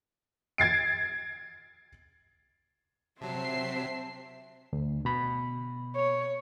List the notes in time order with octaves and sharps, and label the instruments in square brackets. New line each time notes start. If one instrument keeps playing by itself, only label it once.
[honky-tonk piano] G#6 A6 C7 D7
[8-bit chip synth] C3 F#3 [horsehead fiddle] C4 [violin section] E5 C7 [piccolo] A5
[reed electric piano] D2
B2 B5
[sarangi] C#5